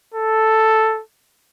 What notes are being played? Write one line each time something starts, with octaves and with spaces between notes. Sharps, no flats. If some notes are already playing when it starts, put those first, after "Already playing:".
A4